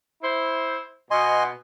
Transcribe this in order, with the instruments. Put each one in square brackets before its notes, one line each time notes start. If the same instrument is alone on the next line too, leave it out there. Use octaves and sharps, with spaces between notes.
[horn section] E4 C5
[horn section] B2 [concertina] D#5 G#5 C6